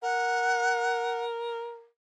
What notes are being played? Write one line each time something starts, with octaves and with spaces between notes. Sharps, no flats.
A#4 F#5